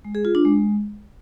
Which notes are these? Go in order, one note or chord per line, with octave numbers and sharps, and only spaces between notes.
G#3
G#4
F4
D4
G#3